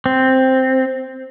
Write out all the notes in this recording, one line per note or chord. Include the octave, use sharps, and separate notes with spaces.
C4